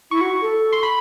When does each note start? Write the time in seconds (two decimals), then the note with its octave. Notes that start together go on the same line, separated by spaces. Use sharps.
0.11 E4 C#6
0.21 F#4
0.41 A4
0.72 C6
0.83 B5